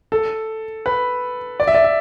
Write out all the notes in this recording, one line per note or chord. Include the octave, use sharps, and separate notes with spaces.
A4
B4
D5
E5
D5
E5